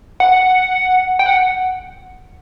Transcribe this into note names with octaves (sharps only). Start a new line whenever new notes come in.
F#5
G5
F#5